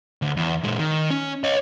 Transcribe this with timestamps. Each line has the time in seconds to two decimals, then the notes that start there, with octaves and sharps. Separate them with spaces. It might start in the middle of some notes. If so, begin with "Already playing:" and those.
0.22 D2
0.37 E2
0.64 A#2 G#3
0.79 D#3
1.11 C#4
1.44 C#5 D#5